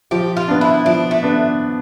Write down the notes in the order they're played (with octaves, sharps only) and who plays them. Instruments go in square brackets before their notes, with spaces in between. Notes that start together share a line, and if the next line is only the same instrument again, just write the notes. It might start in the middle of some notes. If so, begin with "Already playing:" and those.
[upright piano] F3 [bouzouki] G4
[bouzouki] F4
[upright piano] B3 D4
[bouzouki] E4
[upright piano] F3 [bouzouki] D4
[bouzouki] A3
[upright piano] B3 D4